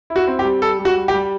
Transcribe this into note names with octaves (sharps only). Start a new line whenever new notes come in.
E4
F#4
C4
G4
G3
G3 A4
G3
F#4
G3
G4
G3